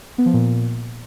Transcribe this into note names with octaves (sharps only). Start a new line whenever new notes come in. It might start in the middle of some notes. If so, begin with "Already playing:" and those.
B3
F3
A#2